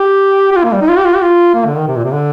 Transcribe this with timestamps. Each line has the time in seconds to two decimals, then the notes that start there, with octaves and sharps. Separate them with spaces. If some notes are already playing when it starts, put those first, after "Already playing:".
Already playing: G4
0.52 G4
0.56 F4
0.64 A#3
0.72 G3
0.81 D#4
0.89 F4
0.98 G4
1.06 F4
1.14 G4
1.22 F4
1.54 A#3
1.66 D3
1.77 D#3
1.87 C3
1.96 A#2
2.05 C3
2.12 D3